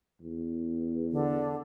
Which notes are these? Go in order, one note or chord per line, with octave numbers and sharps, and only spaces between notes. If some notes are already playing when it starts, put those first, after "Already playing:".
E2
D3